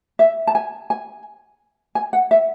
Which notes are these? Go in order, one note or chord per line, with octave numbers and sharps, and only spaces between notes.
E5
A5
G#5
G#5
G#5
F#5
E5